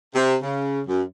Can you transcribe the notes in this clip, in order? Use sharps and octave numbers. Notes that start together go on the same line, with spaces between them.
C3
C#3
F#2